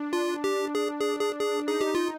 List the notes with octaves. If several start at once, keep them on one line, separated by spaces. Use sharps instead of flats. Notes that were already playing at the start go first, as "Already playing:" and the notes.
Already playing: D4
F4
G4
G#4
G#4
G#4
G#4
D#4 G#4
G4
F4